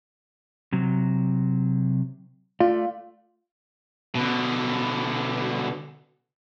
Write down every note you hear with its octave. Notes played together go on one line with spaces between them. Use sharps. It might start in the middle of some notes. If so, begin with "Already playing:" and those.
C3 F#3
A3 F4 D5
B2 D3